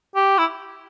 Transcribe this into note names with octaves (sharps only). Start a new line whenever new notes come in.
G4
E4